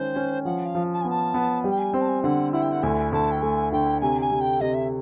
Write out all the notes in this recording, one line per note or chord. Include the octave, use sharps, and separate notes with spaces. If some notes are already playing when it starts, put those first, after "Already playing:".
Already playing: D#3 G#3 C#4 C5
C#4
F3 F#5
F5
F3
A5
B3 G#5
A5
B3
G3
G5
G#5
C4 G5
A5
G#5
D3 F#5
E4 F#5
G5
F#5
D2 G#5
D2 A5
G5
A3 G#5
D3 G5
C3 G#5
G#5
C3
G5
C3 D#5
E5